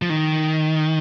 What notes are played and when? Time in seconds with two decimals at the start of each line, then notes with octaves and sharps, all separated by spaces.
0.02 F3
0.10 D#3